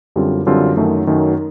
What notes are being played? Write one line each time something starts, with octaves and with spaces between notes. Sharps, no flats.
F#2 D3 G3 C4 F4
F#2 D3 G3 C4 F4
F#2 D#3 F#3 A3
F#2 D#3 F#3 A3